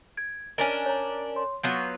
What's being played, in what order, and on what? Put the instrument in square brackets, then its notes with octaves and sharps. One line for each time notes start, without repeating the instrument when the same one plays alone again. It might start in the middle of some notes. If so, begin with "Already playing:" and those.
[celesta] G#6 D7
[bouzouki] C#4 D4 A#4 [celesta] D#5 G#5
[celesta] C#5 A#5
C#5 C6
[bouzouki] F#3 B3 F4 [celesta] G6